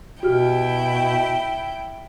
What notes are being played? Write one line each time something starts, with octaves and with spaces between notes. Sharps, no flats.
B2 E4 F#4 G4 G5 F6